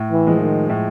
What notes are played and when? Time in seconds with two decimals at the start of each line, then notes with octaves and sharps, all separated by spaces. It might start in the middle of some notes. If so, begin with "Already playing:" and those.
Already playing: A2
0.12 E3
0.27 F3 G#3
0.41 D#3
0.69 A2